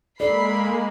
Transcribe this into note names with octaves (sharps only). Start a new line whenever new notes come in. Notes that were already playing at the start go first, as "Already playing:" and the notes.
G#3 A#3 A4 A#4 D5 B5 C7